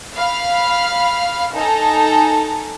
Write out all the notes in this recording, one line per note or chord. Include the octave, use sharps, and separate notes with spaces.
F5 B5 F6
D#4 A4 G#5 A#5